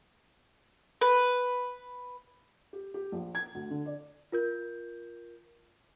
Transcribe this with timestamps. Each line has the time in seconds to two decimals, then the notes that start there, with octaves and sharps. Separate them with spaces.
1.01 B4
2.73 G4
2.94 G4
3.12 A#1
3.35 G#6
3.55 D2
3.71 D3
3.86 D5
4.32 F4 A#4 G6